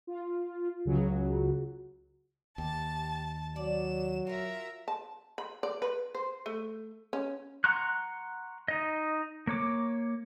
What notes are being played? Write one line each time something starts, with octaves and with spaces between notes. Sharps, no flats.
F4
C#2 C#3 F#3
D#2 G4 A5
F#3 D5 E7
F4 F#4 A#4 E5
A5
B5
D5
B4
C5
A3
C#4
F#5 A#5 C6 C#6 F#6
D#4 D#5
A#3 C#5 D6